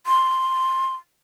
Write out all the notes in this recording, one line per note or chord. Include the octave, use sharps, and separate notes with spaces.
C6